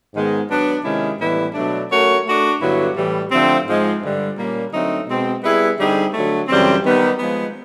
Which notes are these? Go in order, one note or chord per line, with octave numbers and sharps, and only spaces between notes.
G#2 D#3 G#3 B3
F#3 B3 D4
C3 D#3 G#3 C#4 E4
A2 E3 G3 B3 E4
B2 F#3 A3 D4
A3 C#4 F#4 A#4 C#5
A3 D4 F#4
G2 D3 F#3 B3 E4
A2 E3 G3
D3 F3 A3 C4
G#2 F3 G#3
G2 D3 G3
A#2 G3 A#3 C#4
D3 F#3 A3 C4 D#4
B2 G#3 C4
G3 B3 E4 G#4 B4
D3 G3 C4 D#4 G#4
D3 F#3 A3
F#2 C#3 E3 G3 C4
D#3 G3 B3 D#4
F3 G#3 B3